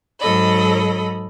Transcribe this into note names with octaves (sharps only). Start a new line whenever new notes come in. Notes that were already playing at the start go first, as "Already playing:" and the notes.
G#2 F#3 A4 D#5 B5